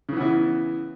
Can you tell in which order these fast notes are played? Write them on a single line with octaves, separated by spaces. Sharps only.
C#3 E3 B3 E4